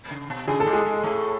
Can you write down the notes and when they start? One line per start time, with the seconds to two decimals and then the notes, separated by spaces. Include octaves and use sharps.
0.11 C#3
0.30 B2
0.48 C#3 G#4
0.60 A4
0.66 G#2 G#3
0.73 G#4
0.85 G#2 G#3
1.04 A2 A3